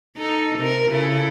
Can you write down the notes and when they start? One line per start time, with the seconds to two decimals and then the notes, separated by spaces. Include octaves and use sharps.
0.17 D#4 A4
0.59 C3 A#4
0.90 C#3 E4 A4